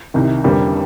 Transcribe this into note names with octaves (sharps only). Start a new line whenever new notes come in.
C2 C3 D#3
F1 F2 D3 G3 A#3